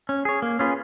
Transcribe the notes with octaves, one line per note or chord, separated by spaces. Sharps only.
C#4
G#4 C#5
A#3
C#4 F4 G#4 B4